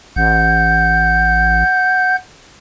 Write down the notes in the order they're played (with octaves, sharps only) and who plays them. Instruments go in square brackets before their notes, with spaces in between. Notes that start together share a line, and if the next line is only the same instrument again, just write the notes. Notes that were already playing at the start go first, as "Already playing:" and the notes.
[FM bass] A1 [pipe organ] F#5 G6